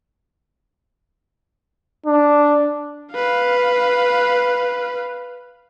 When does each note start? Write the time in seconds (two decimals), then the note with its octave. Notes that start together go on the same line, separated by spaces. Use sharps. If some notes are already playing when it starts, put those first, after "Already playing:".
2.06 D4
3.12 B4 F5